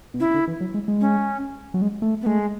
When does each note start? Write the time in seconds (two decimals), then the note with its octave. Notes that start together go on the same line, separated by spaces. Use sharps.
0.14 B2
0.20 C#3 E4
0.34 D3
0.48 E3
0.61 F#3
0.74 G#3
0.88 G#3
1.01 C#4
1.74 F#3
1.82 G#3
2.02 A3
2.22 B3
2.26 G#3 A3